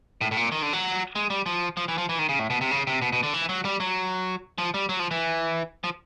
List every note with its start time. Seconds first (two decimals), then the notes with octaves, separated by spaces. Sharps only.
0.21 A2
0.31 A2
0.37 A#2
0.52 D#3
0.62 D3
0.73 F#3
1.16 G#3
1.30 G3
1.46 F3
1.77 F3
1.88 E3
1.98 F3
2.09 E3
2.19 D#3
2.29 C#3
2.39 A2
2.50 B2
2.61 C3
2.71 C#3
2.87 C3
3.02 B2
3.13 B2
3.23 D3
3.34 E3
3.49 F#3
3.65 G3
3.80 F#3
4.58 F3
4.74 G3
4.89 F#3
4.99 F3
5.11 E3
5.84 F3